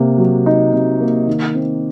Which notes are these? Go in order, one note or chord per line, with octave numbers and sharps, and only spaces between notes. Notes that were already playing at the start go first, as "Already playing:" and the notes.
Already playing: C3 A#3
F#3
D#4
C3
A#3
D#3
C4